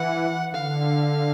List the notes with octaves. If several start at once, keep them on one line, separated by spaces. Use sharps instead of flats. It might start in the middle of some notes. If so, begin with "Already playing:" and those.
Already playing: E3 F#5
D3 F5